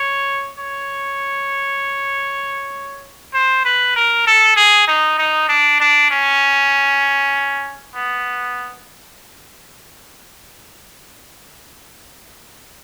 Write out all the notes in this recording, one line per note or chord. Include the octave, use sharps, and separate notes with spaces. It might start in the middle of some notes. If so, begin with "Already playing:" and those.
Already playing: C#5
C#5
C5
B4
A#4
A4
G#4
D#4
D#4
D4
D4
C#4
B3